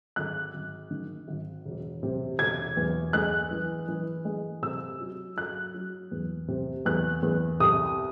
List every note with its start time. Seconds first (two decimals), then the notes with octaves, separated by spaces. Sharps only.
0.16 G#1 F#6
0.54 G#1
0.91 D#3
1.28 G#1
1.65 E1
2.03 C3
2.39 E1 G#6
2.77 E2
3.13 G#3 F#6
3.51 E3
3.88 E3
4.25 G#3
4.62 C3 E6
5.00 F#3
5.37 F#3 F#6
5.74 F#3
6.11 E2
6.48 C3
6.85 E2 F#6
7.23 E2
7.60 C2 D#6